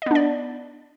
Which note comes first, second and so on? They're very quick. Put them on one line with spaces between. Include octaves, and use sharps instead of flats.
D#5 B3 D4 D5